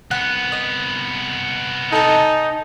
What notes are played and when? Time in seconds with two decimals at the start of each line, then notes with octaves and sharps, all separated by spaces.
0.11 C2 B3 F#5
0.52 D#5
1.92 D#4 A4 G#5 A5